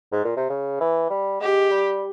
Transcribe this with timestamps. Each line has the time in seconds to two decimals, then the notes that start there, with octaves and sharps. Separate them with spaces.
0.12 G#2
0.25 A#2
0.37 C3
0.50 C#3
0.81 E3
1.10 G3
1.41 G#3 G4
1.71 G3